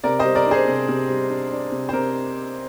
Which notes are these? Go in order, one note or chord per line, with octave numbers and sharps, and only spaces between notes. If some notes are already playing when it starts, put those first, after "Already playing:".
C3 A#4 D5
C5 D#5
G3
A#4 D5
D4 G#4 C5
C3
C3
G3
D4
D4
C3
C5
C3 A#4